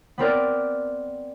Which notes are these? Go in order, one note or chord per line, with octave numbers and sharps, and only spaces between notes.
B3 C4 A#4 D5